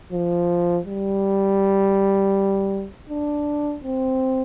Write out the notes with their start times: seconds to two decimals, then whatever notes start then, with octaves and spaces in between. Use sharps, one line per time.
0.12 F3
0.86 G3
3.10 D4
3.84 C4